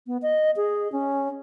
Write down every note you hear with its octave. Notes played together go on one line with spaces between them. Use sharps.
B3
D#5
G#4
C#4